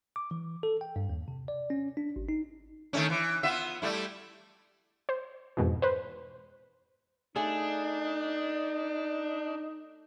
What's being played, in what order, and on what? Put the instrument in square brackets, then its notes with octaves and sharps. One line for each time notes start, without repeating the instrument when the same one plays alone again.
[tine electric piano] D6
E3
A4
G5
G2
D#2
C3
D5
C#4
D4
G#1
D#4
[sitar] D#3 A3 C#4
E3
B3 F4 E5
G3 A3 E4
[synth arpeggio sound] C5
F2 G#2 B2 E3
B4 C5
[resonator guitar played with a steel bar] A3 G#4 [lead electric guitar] D4 [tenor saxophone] D#4